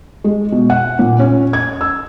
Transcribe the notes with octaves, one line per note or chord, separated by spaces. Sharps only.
G#3
B2
F#5
A#2
C#4
G#6
E6